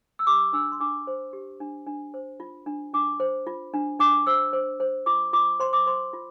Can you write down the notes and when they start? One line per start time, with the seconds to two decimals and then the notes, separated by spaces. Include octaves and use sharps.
0.19 E6
0.27 G4 D6
0.53 D4 E6
0.72 C6
0.80 D4 D6
1.07 C5
1.33 G4
1.60 D4
1.86 D4
2.14 C5
2.40 F4
2.66 D4
2.94 D4 D6
3.20 C5
3.47 F4
3.74 D4
4.00 D4 D6
4.27 C5 E6
4.53 C5
4.80 C5
5.06 F4 D6
5.33 F4 D6
5.60 C5 C6
5.73 D6
5.87 C5 C6
6.13 F4